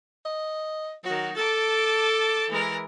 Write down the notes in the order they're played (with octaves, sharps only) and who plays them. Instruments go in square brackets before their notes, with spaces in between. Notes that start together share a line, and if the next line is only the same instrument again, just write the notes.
[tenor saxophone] D#5
[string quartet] D#3 F#4 [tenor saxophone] F#3
[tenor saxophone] A4 [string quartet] A5 D6
[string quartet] E3 G#3 A#4